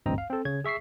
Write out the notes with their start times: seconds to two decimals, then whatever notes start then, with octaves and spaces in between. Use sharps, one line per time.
0.06 A1 D2 G2 C4 D#5 A#5
0.18 F5
0.30 C4 A4
0.45 C#3 C#5 G#6
0.64 G#4 E5 C#6 B6 C7